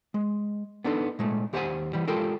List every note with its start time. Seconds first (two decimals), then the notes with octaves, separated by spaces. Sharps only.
0.14 G#3
0.84 B3 D4 D#4 A4
1.19 A#2 G#3 A3
1.53 D#2 G4 C5 E5 F#5 G#5
1.93 E3 G3
2.08 G#3 F4 G4 A4 A#4